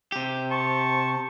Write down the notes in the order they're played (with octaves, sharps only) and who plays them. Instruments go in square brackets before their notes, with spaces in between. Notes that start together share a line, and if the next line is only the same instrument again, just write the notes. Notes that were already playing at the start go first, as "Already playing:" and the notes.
[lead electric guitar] C3 G4
[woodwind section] C5 A5 C#6